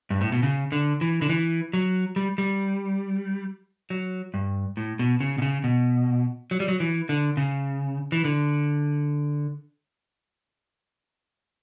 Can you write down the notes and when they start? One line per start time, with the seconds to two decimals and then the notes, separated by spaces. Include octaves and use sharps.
0.10 G2
0.21 A2
0.32 B2
0.43 C#3
0.72 D3
1.01 E3
1.22 D3
1.29 E3
1.73 F#3
2.16 G3
2.38 G3
3.90 F#3
4.34 G2
4.77 A2
4.99 B2
5.20 C#3
5.38 B2
5.42 C#3
5.64 B2
6.51 F#3
6.60 G3
6.68 F#3
6.80 E3
7.09 D3
7.37 C#3
8.12 E3
8.25 D3